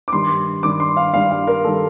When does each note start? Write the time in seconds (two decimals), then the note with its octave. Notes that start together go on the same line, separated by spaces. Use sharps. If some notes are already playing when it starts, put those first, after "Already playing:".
0.08 D6
0.12 G2 D#3 G3 C6
0.63 G2 D#3 G3 D6
0.80 C6
0.97 F5
1.14 G2 D#3 G3 F5
1.31 F5
1.47 A#4
1.64 D#3 G3 A4